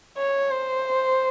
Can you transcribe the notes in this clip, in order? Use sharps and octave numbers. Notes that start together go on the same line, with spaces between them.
C#5
C5